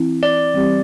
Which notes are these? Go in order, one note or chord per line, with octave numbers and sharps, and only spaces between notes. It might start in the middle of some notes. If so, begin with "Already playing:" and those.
Already playing: E3 C4 E4
D5
E3 G3 C4 G4 C5